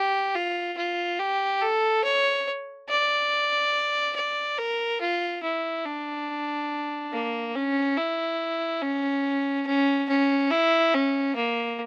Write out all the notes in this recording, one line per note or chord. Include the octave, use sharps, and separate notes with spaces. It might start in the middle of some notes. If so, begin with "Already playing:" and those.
Already playing: G4
F4
F4
G4
A4
C#5
D5
D5
A#4
F4
E4
D4
A#3
C#4
E4
C#4
C#4
C#4
E4
C#4
A#3